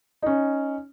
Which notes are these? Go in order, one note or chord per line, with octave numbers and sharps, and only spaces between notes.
C#4 D#4